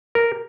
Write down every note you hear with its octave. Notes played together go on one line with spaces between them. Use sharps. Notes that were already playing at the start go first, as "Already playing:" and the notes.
A#4